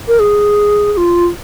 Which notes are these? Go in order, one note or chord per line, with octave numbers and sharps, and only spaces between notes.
A#4
G#4
G#4
F4